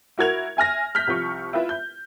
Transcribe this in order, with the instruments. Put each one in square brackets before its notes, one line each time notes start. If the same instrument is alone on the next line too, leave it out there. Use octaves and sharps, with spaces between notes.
[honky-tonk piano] E4 F#4 A#4 G#6 F7
E5 G#5 F6 A#6
F6 G6 B6
C2 F3 C#6
E4 F4 B4 E5
G6